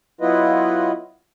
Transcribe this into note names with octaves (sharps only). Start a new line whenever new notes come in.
F#3 B3 E4 F4 B4 D#5